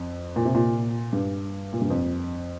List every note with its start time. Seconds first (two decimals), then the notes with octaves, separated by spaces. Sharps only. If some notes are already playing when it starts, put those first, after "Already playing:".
Already playing: F2
0.36 A#2
0.45 C3
0.55 A#2
1.13 G2
1.73 A#2
1.82 G2
1.90 F2